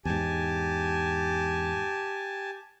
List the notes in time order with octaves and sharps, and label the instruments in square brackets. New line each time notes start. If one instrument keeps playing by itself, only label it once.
[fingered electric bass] E2 G#2 [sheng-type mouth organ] G4 G#5 A5